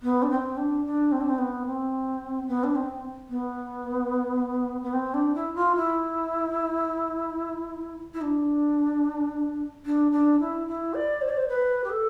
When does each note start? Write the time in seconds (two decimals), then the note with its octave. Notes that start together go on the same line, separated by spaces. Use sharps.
0.02 B3
0.22 D4
0.30 C4
0.57 D4
0.84 D4
1.11 C4
1.20 D4
1.28 C4
1.38 B3
1.66 C4
2.47 B3
2.63 D4
2.75 C4
3.29 B3
4.82 B3
4.93 C4
5.13 D4
5.34 E4
5.54 F4
5.75 E4
8.13 E4
8.21 D4
9.85 D4
10.11 D4
10.39 E4
10.67 E4
10.93 D5
11.21 C5
11.29 D5
11.36 C5
11.48 B4
11.83 G4
11.89 A4